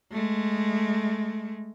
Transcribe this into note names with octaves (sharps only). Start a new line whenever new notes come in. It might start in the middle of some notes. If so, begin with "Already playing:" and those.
G#3 A3